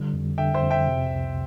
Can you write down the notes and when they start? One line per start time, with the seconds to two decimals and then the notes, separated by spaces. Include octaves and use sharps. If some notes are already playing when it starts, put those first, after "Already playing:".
Already playing: D3 G3
0.13 F2
0.38 D3 E5 G5
0.54 C5 E5
0.63 F2
0.71 E5 G5
0.87 C3
1.12 C2